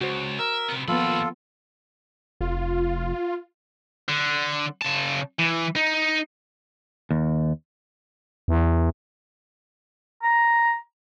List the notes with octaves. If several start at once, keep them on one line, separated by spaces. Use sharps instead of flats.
C#2 F#4 C5
A#4 E5
C3 B3
D#2 F3 A#3 B3 F4 A4 B5
F1 F4
D3
C#3 A5
E3
D#4
D#2
E2
A#5